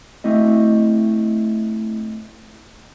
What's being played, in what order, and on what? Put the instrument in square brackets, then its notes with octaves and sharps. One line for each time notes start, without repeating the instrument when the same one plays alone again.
[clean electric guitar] A3 C4 E4 D#5